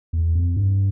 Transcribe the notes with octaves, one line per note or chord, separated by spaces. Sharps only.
E2
F2
G2